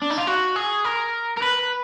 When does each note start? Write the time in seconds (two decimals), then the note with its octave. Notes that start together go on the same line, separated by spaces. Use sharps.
0.02 D4
0.10 D#4
0.18 F4
0.27 F#4
0.56 G#4
0.85 A#4
1.37 A#4
1.42 B4